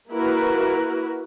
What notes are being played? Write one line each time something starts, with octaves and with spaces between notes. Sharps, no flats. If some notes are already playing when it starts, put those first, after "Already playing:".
A#3 E4 F#4 A#4 B4